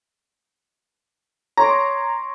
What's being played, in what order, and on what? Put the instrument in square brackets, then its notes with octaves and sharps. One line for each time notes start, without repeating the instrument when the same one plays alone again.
[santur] C#5 C6 D6 [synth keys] A#5